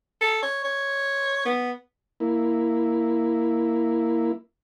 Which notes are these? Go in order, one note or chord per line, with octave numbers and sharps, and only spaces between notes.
A4
C#5
C#5
B3
A#3 E4